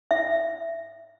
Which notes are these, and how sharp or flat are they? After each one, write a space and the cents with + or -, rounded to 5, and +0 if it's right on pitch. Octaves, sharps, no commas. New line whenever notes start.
E5 +10